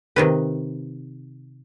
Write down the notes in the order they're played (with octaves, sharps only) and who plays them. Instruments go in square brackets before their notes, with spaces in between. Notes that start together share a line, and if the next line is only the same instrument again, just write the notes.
[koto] C3 D#3 B4